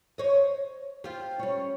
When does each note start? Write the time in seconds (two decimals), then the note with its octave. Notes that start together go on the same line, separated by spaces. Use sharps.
0.18 C5 C#5 D#5
1.04 C4 F4 G4
1.39 G3 C#4